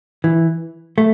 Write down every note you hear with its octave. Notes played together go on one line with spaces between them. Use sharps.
E3
A3